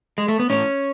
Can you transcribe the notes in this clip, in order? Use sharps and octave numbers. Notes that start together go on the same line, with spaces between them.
G#3
A3
B3
A2 C#4